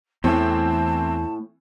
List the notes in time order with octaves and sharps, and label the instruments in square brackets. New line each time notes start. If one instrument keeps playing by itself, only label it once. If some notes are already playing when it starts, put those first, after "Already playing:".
[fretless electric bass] E2 A3 [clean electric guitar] A2 [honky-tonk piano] E3 C4 [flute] A5